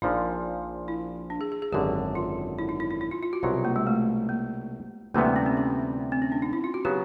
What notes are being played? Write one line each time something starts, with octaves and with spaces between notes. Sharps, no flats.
A#1 A#2 F3 D#4
E4
D4
G#4
G#4
G#4
G#1 F#2 D3 G4
F4
E4
D#4
E4
E4
E4
F4
F4
F#4
C2 B2 F#3 F4
A#3
G#3
A3
A#3
D2 C3 E3 G3 A#3 B3
C4
C#4
C4
C#4
C4
C#4
D4
D#4
E4
F4
F#4
C#3 F#3 B3 G4